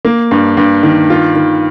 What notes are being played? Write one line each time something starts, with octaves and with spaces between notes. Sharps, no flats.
A#3
G2
G2
D#3
F4
D#3